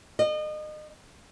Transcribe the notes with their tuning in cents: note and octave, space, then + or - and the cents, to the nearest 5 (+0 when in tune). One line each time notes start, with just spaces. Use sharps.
D#5 -30